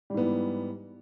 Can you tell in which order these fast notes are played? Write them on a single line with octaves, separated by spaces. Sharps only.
G3 G#2 B3 E3